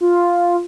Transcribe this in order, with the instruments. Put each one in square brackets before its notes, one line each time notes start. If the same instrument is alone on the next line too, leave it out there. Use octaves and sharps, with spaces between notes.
[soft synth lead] F4